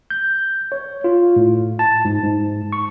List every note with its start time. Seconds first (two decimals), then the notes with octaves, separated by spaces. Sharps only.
0.10 G6
0.72 C#5
1.04 F4
1.36 A2
1.79 A5
2.05 G#2
2.23 G#2
2.73 C#6